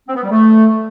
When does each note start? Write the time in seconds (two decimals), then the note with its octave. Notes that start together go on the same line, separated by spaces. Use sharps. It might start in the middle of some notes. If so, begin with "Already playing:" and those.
0.08 C4
0.16 B3
0.23 G3
0.30 A3